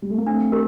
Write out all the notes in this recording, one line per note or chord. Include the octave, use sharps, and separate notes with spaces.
G3
A3
A#3
A3 C4 D4
G4 A#4